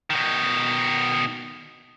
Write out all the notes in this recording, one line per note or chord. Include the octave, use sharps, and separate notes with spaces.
B2 D#3